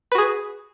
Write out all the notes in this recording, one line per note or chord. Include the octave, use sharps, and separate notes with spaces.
F#4 G#4 B4